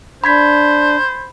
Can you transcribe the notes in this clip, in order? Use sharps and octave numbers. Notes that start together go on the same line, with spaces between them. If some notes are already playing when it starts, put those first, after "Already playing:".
D4 C5 B5 G#6 B6